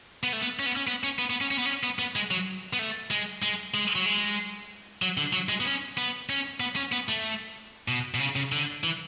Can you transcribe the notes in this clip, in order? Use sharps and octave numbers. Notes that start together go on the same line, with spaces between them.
B3
A3
B3
C#4
B3
C#4
B3
C#4
B3
B3
C#4
C#4
B3
C#4
B3
B3
G#3
F#3
B3
A3
G#3
G#3
G#3
F#3
G#3
F#3
D3
F#3
G#3
B3
C#4
B3
C#4
B3
C#4
B3
A3
B2
B2
C#3
C#3
D3
E3